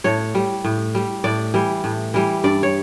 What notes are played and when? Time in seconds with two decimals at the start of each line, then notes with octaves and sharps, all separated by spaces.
0.04 A2 C#5
0.35 G3
0.64 A2
0.95 G3
1.24 A2 D5
1.54 E3 G3
1.84 A2
2.14 E3 G3
2.44 G2 D5
2.63 C#5